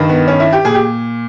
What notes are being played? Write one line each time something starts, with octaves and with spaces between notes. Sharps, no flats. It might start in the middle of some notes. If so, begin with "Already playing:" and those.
Already playing: G2 D#3
B3
C#4
E4
G4
A#2 G#4
G4